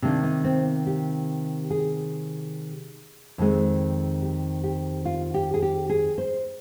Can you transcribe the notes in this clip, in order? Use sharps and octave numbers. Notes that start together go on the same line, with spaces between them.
C3 D#3 A#3 D4
D#4
C4
G4
G#4
F2 D#3 G#3 C4
G4
G4
F4
G4
G#4
G4
G#4
C5